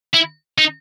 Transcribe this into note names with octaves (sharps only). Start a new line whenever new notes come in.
E4
D#4